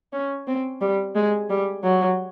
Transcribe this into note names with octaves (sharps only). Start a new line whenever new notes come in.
C#4
C4
G3
G#3
G3
F#3